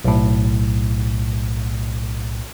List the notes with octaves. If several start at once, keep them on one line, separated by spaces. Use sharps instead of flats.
B1 A2